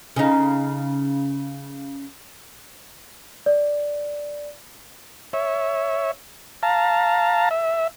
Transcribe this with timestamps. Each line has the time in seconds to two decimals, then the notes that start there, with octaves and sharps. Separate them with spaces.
0.16 C#3 D#4
3.46 D5
5.33 C#5 E5
6.63 F5 A5 A#5
7.51 E5